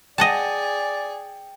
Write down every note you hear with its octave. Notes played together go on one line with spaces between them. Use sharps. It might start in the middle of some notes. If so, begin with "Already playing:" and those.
G#4 D5 D#5 F#5 G5 A5